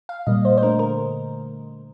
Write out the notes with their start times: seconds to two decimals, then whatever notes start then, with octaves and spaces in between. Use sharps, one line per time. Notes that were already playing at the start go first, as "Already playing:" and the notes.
0.09 F5
0.27 A#2 G3 A#3 D#5
0.45 C5
0.58 C5
0.62 D3 A3 A#4
0.79 A#4